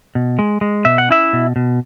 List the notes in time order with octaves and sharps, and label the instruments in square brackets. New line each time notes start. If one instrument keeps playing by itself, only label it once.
[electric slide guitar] B2
G#3
G#3
B2 E5
F#5
C#4 E4 E5
B2
B2